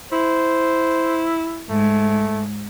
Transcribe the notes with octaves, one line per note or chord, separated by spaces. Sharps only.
E4 C5
G#2 A3